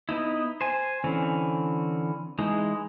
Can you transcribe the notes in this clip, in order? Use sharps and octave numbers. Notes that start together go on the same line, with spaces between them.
B3 D#4 E4
C5 G#5
D3 E3 C4 C#4
E3 G#3 D#4 E4